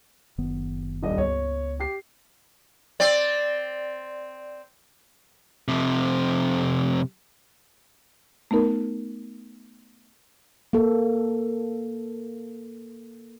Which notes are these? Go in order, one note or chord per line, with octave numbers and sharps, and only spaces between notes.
F#1 D#3 B3
D#1 G2 D#5
C#2 B3 C#5
G4 C7
C4 D5
F2 C3
A3 B3 D#4 A#4
A#3 A4